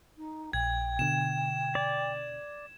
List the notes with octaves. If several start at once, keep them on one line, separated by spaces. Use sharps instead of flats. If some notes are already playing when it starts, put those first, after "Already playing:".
D#4
A#1 G5 G#6
B2 D3 E7
D5